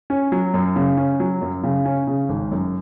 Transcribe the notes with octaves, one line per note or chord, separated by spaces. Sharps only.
C#4
F#3
F#2
C#3
C#4
F#3
F#2
C#3
C#4
C#3
G#1
F#2